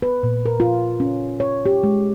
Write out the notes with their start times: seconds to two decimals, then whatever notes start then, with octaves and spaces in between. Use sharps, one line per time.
0.02 B4
0.23 A#2
0.46 A#4
0.60 F4
1.00 C#4
1.40 C#5
1.66 G4
1.83 G#3